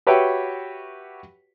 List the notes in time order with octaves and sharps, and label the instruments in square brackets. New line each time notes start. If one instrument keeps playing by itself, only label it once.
[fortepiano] F#4 G4 B4 C#5 E5 G5